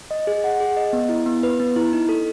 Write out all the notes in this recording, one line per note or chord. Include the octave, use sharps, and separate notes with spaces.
D#5
G#4
F#5
G#4
D#5
B3
E4
B3
B4
B3
E4
D#4
A4